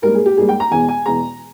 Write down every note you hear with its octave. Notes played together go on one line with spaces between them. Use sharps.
G#2 G3 A#3 A#4
G#4
G4
G#2 G3 A#3 G#4
G5
A#5
E2 B2 G#3 G#5
G#5
E2 B2 G#3 A#5